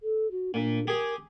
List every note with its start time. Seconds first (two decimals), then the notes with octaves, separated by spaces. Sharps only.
0.03 A4
0.31 F#4
0.54 A#2 D4
0.87 G4 G#4 A#4